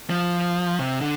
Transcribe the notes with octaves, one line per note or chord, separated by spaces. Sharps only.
F3
C3
D3